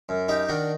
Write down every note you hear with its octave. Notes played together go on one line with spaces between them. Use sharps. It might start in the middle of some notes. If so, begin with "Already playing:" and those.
F#2
D#4 G4
D#3 D4 F#4